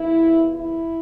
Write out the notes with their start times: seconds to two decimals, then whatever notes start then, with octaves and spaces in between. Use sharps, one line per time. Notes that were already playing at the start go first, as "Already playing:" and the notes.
Already playing: E2 E3 A#3 E4
0.54 E4